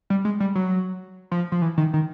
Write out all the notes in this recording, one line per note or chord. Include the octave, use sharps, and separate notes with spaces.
G3
G#3
G3
F#3
F3
F3
E3
D#3
D#3